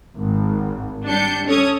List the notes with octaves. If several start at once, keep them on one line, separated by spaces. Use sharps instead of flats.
G#1
G3 D4 G6 C#7
C#4 A4 C#5 D#6 G#6